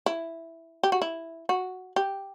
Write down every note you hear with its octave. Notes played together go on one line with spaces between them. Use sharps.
E4
G4
F#4
E4
F#4
G4